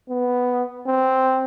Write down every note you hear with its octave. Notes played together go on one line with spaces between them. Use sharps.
B3
C4